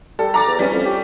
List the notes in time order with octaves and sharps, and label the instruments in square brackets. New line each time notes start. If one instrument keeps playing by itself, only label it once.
[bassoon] G3 [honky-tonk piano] A4
[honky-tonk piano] A#5 D6 A6
[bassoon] E2
[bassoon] E3 [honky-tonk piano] G3 C#4
[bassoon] F2
G4